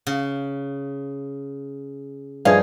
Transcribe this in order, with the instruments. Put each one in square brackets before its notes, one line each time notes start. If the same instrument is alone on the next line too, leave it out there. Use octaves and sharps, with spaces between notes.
[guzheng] C#3
[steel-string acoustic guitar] G2 F3 [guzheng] D#4 [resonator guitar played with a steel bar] G#4 F5